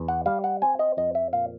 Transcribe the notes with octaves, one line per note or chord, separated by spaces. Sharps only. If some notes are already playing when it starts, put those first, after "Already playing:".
Already playing: E2
F#5
G3 F5
F#5
C4 G#5
D#5
F2 D#5
E5
A#2 F5